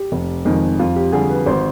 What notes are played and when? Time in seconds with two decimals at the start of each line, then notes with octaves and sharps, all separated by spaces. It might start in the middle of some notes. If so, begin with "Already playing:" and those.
Already playing: G4
0.12 F1
0.45 F2 D#3 G#3
0.79 F2 F4
0.96 G4
1.13 D3 G3 G#4
1.29 B4
1.46 G#1 C5